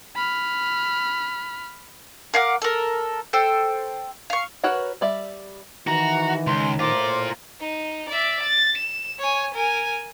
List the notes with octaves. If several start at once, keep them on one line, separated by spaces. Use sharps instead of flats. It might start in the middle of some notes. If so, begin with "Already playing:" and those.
B5 F6
A#4 F5 F#5 D6
A4 A#4
A4 C5 G5
F5 C#6
F#4 A#4 B4 C#5 F#5
G3 D5 E5
D#3 E3 F#4 A#5
C#2 C6
A2 F4 A#4 C5 D6
D#4
D5 E5
A6
E7
C#5 G#5
A#4 G#5